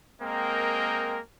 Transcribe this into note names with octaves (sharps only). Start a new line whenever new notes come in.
G#3 A#3 C4 A#4 D#5 G5